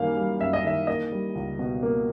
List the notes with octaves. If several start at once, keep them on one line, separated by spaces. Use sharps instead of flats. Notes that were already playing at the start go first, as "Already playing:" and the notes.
Already playing: F#2 D#3 G3 A#3 F5
G3
F#2 E5
D#5
D#3 E5
A#3 D#5
G3
C#2
B2
A#3